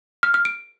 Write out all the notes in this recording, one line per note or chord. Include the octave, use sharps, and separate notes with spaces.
F6
F6
D7